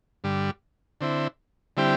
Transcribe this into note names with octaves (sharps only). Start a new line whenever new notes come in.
G2 D3 G3
D3 C4 E4
D3 G3 C4 E4 G4